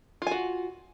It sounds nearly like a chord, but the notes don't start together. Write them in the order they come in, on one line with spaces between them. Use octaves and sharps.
F4 G#5 F#4